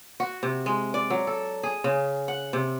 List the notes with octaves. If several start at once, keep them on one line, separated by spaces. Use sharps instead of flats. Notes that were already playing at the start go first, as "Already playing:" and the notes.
F#4
C3
G#3
D5
F#3
A4
G#4
C#3
F#5
C3